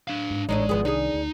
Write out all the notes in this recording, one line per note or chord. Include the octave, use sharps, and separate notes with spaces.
D4 F5
G#2
A1 A2 G#3 D4 D#4
G#1 E2 F3 B3 G#4
C2 D#3 D4 D#4 G#4
D2